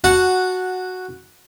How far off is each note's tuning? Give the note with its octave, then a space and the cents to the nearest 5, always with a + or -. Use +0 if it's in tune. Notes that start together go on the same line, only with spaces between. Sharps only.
F#4 +0 F#5 -5 A5 +0